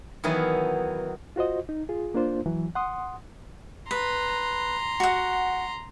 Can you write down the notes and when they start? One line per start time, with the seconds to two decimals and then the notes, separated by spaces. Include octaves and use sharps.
0.24 D#3 E3 F#3 B3 E4
1.36 F4 F#4 C5 D#5
1.69 D#4
1.89 F4 G#4
2.14 A#3 D4 F4 C5
2.46 E3 F#3
2.75 F#5 C6 D#6
3.91 B4 A#5 C6
5.00 F#4 F#5